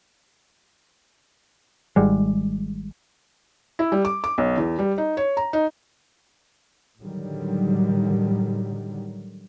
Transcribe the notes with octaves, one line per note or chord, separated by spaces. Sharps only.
G#1 G#2 G3 G#3
E4
G3
D6
D6
B1
E2
G3
D#4
C#5
A#5
D#4
A2 D3 D#3 F#3 G3